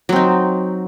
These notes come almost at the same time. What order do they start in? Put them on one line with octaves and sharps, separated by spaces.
F#3 C4 D#4